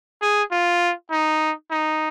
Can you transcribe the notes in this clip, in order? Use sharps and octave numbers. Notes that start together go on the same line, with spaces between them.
G#4
F4
D#4
D#4